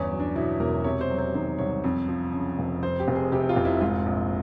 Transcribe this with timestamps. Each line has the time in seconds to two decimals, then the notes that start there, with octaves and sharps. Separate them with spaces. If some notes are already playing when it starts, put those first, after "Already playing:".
Already playing: G1 E2 C#4
0.11 F#3
0.20 D4
0.35 B2 E4
0.60 E1 A#4
0.84 C3 C#5
1.01 C5
1.10 F#3
1.18 C5
1.34 D#3 C5
1.58 C2 C#5
1.84 F2
2.08 F3
2.33 C#3
2.59 F1
2.83 F2 C5
3.00 G4
3.08 F1
3.16 G#4
3.32 C3 G4
3.49 F4
3.56 F1
3.65 E4
3.81 G#2 F4
4.06 A#1